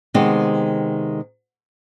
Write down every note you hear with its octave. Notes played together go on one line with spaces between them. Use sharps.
C3 D#3 G#3 B3 C4 D#5